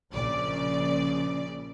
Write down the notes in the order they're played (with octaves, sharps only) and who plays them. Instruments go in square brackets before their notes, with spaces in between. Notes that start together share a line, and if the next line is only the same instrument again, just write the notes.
[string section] A#1 C#3 D5